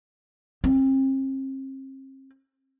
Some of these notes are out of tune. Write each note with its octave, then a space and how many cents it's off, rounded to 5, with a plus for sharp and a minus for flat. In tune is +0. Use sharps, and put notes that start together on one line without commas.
C4 +40